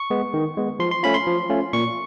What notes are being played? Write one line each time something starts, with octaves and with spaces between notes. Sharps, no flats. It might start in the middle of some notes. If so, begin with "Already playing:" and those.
Already playing: C#6
G#3 B3
D#3
G#3 B3
F3 C6
C6
A3 C#4 F4 B5
C6
F3
A3 C#4 F4
A#2 C#6